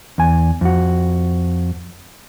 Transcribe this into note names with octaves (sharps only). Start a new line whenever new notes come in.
E2 G#5
F2 F#4